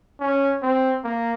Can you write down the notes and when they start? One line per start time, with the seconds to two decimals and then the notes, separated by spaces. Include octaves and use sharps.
0.20 C#4
0.62 C4
1.04 A#3